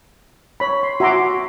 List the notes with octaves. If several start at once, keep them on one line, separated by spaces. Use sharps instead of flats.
C#5 B5
C6
F#4 E5 G#5 A#5 C6 D6